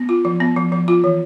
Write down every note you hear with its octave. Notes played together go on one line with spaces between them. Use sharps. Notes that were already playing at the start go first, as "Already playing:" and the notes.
Already playing: B3
F4
F3
B3
F3
F3
F4
E3